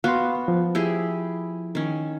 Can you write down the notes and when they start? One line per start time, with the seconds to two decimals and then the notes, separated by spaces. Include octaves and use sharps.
0.04 B3 F#4 F5 C6
0.48 F3
0.75 E4 G4 G#4
1.75 D#3 C#4